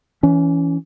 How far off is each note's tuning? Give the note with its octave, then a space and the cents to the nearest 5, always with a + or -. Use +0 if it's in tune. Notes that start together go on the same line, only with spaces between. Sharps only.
E3 +5 C#4 +20